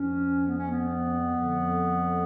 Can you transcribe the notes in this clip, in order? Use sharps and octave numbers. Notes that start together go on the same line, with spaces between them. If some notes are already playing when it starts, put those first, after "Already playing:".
Already playing: F2 F3 C#4
B3
C#4
B3
F2 D3 F3